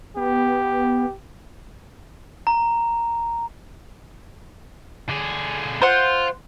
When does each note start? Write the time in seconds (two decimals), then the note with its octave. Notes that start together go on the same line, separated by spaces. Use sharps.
0.17 B3 G4
2.47 A#5
5.09 D3 G#4
5.82 F4 C5 F#5